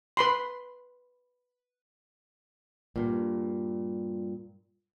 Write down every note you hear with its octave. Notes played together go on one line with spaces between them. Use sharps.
B4 B5 C6
G2 A#2